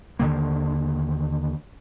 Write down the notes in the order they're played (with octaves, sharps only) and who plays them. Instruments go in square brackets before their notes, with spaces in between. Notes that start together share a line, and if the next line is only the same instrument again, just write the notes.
[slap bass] D#2 D3 D#3 A#3